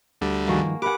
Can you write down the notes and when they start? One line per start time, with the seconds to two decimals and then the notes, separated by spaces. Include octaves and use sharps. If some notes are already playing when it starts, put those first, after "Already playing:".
0.21 D2 D3 G3
0.47 G2 D#3 F3 A#3 F#4 G#4
0.82 G4 A#4 B4 F#5 G#5 D6